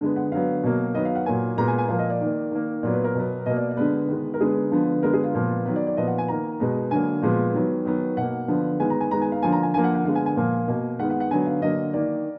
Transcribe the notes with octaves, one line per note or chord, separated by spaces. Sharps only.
D3 G#3 B3
F#5
D3 F#3 B3 F5
B2 F#3 A#3
D#3 F#3 B3 D#5
F5
F#5
A#2 F#3 A#3 G#5
A#2 G#3 B3 A#5
G#5
G#5
A#2 F3 A#3 F5
D#5
D5
D#3 A#3
D#3 A#3
A#2 F#3 B3 D5
B4
A#4
B2 F#3 B3
B2 A#3 D#5
D5
D5
D3 G#3 B3 B4
D#3 G#3 B3
A#4
D3 G#3 B3 G#4
D3 F3 B3
D3 G#3 B3 A#4
G#4
F4
A#2 F3 B3
D#3 F#3 B3 B4
D5
D5
A#2 F3 B3 D#5
F#5
G#5
D#3 A#3 A#5
B2 G#3 B3
D3 F#3 A#3 G#5
A#2 F3 G#3 B3
D#3 F#3 B3
D#3 F#3 B3
B2 A#3 F#5
D3 F3 B3
D#3 G#3 B3 G#5
A#5
G#5
D#3 G#3 B3 A#5
G#5
F5
D3 F3 A#3 G#5
A#5
G#5
D3 F3 A#3 G#5
F#5
F#5
D3 G#3 B3 F5
G#5
G#5
A#2 F3 A#3
B2 A#3
D#3 G#3 B3 F#5
F#5
F#5
D3 F#3 B3 G#5
F5
D3 F#3 A#3 D#5
D#3 A#3 D5